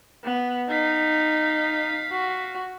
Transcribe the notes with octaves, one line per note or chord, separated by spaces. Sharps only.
B3
D#4 F5 B6
F#4